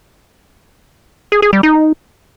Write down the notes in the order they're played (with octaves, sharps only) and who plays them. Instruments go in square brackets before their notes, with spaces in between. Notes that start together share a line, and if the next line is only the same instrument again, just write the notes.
[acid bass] G#4
G#4
G3
D#4